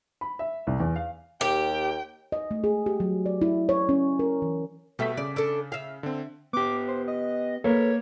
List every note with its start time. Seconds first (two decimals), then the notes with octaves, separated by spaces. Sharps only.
0.21 B5
0.39 E5
0.67 C2
0.80 E2
0.96 F5
1.41 D#2 G4 G5
2.32 D#5
2.51 A3
2.64 G#4
2.86 G4
3.00 F#3
3.26 D5
3.42 E4
3.69 C#5
3.89 C#4
4.19 A#4
4.42 E3
4.99 B2 G3 A3 E5 B6
5.17 C#3 D5
5.36 D4 A4
5.72 E5 F5
6.03 D3 C4
6.53 B3 G4 D6
6.88 C5
7.08 D#5
7.64 A#3 A4 B4 C#5